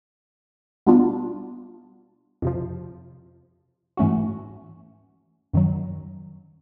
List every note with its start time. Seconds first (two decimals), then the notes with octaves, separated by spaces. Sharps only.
0.87 B2 G3 B3 D4 F4
2.42 F2 C3 F3
3.97 G#2 E3 A3 C#4 F#4
5.54 F#2 D#3 F#3